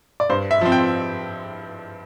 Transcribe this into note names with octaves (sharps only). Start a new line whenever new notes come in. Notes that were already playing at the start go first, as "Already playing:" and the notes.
D5
G2 C5
E5
F3 C4
G5